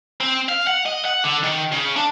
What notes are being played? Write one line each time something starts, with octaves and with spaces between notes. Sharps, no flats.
C4
F5
F#5
D#5
F#5
D3
D#3
C#3
D4